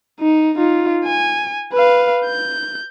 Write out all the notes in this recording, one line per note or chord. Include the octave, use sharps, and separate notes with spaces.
D#4
D#4 F4
G#5
B4 F5
G6